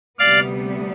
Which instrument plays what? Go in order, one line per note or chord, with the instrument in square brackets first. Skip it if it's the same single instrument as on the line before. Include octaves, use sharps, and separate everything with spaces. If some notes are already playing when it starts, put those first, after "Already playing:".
[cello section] D2 C3 G3 B3 [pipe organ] D5 F5